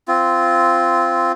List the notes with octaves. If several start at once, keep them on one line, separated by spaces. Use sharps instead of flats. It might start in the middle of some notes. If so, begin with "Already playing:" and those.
C4 F4